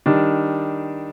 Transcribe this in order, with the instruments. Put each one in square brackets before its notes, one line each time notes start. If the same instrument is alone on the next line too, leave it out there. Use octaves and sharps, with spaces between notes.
[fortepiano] D#3 G3 D4